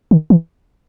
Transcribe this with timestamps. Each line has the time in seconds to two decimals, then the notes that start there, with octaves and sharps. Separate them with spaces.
0.11 D#3
0.30 E3